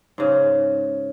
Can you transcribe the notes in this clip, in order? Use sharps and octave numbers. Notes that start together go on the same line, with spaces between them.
G#2 C#3